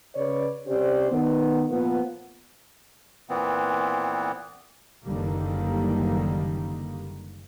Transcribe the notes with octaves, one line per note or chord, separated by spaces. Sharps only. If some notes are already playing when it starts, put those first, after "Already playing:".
C#3 B4 C#5 D5
C3 C#4 G4 C5 D5
D#3 B3
A#2 F3 A#3 B3
A#2 E3 B3 C4
F#1 D3 D#3 G3 A#3